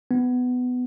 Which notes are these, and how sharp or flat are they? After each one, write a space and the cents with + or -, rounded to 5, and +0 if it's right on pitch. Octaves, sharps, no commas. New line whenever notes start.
B3 +15